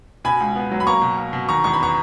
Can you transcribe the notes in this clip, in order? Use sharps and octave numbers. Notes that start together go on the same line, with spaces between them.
B2 G#5 B5
C#2
B3
F#3
B5
A#3 A#5 C#6
B2
A#3
B2
D#3 A#5 C#6
E2 C#6
B5
B3 A#5 C#6